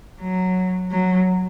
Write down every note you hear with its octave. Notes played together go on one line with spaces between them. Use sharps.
F#3
F#3